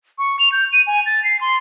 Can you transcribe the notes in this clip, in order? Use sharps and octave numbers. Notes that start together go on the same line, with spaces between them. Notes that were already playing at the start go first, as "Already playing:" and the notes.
C#6
F7
G6
D#7
G#5
A6
C7
C6